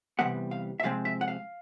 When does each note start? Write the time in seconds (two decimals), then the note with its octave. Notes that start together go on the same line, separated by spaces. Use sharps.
0.19 C3 E3 G3 B3 F#5
0.51 F5
0.80 E5
0.83 C3 F3 G#3 C4 F5
1.05 E5
1.21 F#5
1.28 F5